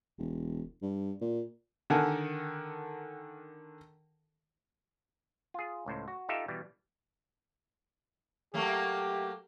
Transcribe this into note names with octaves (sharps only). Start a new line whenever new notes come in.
E1
G2
A#2
D3 D#3 A4 A#4 F#5 G#5
F4 G#4
C#2 A2 C5
F#4
D#4 F4 G4 A4 E5 F5
B2 E3 G3
F#3 A3 A#3 G4